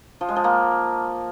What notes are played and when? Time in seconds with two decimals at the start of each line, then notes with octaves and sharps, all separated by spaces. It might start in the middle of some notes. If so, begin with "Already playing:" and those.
0.21 F3
0.29 G#3
0.36 F3
0.44 A#3